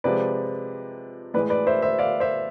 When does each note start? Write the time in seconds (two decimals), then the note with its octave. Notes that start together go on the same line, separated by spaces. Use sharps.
0.04 C3 F3 G#3 B4 D5
1.34 A2 E3 G#3 B4 D5
1.50 B4 D5
1.67 C5 E5
1.82 C5 E5
1.99 D5 F5
2.20 C5 E5